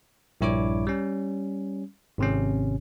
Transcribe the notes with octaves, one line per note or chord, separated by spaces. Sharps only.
A#1 G2 E4 C#5 D5 D6
G3 C#4
G#1 C3 C#4